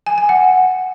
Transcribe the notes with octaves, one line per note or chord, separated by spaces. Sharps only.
G#5
G#5
F#5